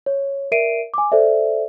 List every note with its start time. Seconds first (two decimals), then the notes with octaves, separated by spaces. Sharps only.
0.06 C#5
0.52 A#4 D5 E5 C7 D7 D#7
0.94 G#5 D6
1.12 A4 C5 D5 E5